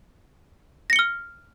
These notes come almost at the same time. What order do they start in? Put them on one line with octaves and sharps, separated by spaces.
A#6 C#7 G7 F6